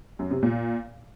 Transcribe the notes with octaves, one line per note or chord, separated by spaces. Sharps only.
F#2
C3
A#2